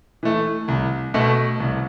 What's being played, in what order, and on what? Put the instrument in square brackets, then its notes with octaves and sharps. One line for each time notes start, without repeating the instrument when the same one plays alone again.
[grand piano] E3 A3
C2
B2 A3
C2